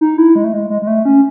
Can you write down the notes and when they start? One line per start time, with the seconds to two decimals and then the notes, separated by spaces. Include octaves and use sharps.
0.01 D#4
0.18 E4
0.35 G#3
0.44 A3
0.53 G#3
0.70 G#3
0.82 G#3
0.87 A3
1.05 C#4